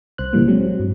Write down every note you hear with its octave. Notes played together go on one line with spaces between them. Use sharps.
C2 C5 F#6
A#2 C#3 E3 G3 A#3
F#3 G#3 C4
F#3
G2